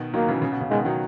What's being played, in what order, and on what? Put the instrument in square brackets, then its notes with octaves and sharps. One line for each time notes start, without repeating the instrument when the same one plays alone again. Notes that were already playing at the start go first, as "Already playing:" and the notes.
Already playing: [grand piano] B2 D#3
[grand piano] D#3 F#3 [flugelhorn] A#3
[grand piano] C#3 E3
C#3
B2
C#3
[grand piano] B2 D#3 [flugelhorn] G#3
[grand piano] D#3 F#3